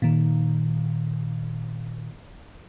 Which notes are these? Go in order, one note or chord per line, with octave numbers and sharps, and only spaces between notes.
A#2 D#3